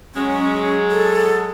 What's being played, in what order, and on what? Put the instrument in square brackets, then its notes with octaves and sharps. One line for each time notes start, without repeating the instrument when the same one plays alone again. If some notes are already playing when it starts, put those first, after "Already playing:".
[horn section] F#3 G#3 [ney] C#4
[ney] A4